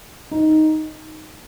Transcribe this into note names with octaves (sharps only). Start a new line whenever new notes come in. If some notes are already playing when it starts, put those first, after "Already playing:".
D#4